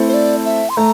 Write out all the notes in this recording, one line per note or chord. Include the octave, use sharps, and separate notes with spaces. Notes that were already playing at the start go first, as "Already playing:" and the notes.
Already playing: A3 C4 E4 A4
C5
D5
E5
C6
A3 A#5